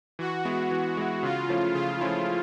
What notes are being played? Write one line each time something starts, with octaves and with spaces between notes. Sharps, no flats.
E3 F#4
G#3 B3 E4
E3
G#3 B3 E4
C#3 F4
F3 A3 C#4 E4
C#3 F4
F3 A3 C#4 E4